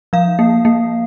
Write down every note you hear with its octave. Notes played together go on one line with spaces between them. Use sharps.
F3 F5
A#3
A#3